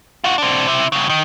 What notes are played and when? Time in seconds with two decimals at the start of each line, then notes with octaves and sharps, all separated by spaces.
0.24 F4 F#4
0.38 C4 D4
0.67 C3 E4
0.92 G2 C#3
1.09 D#3